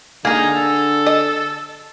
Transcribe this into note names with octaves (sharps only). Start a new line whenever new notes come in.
D3 A#3 D#4 G#4 A#4
A4
D#5